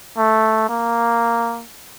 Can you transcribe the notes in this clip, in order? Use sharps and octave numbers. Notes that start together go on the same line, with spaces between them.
A3
A#3